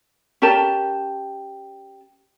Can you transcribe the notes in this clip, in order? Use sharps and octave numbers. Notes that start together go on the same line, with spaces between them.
C#4 G4 A#4 A5